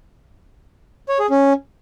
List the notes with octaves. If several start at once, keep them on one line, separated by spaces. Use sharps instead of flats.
C#5
G#4
C#4